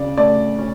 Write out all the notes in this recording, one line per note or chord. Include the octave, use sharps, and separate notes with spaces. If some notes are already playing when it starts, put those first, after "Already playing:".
Already playing: C#3 D5
A3 D5
C#4